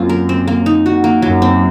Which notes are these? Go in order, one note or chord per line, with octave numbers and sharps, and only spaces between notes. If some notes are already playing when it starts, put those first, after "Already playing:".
Already playing: F#2 A#3 C4 F4
A#4
C4
A#3
D#4
F#4
A#3
F#2 F#3
C4